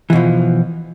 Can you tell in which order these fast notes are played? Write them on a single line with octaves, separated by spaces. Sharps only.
E3 B2 F3